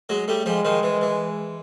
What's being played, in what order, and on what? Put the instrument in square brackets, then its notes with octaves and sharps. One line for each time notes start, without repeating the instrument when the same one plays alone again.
[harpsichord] F#3 G#3
G3 A3
[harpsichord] F3 G3 [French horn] G#3
[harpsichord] D#3 F3
E3
E3